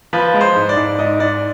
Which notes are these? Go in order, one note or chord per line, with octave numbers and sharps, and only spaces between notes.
F3 B4
G#3
C5
G#2
D5
G#2
G#2 D#5
G#2 D5